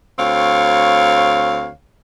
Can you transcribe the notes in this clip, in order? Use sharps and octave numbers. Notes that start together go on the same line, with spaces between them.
D2 C4 C#5 F5